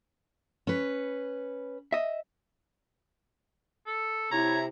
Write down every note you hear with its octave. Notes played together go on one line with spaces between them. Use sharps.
C#4 B4
D#5 E5
A4
C3 E4 C#5 A#5